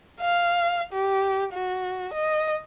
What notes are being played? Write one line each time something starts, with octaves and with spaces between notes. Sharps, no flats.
F5
G4
F#4
D#5